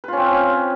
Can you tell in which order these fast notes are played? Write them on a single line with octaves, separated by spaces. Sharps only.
B4 F4 C#4 C4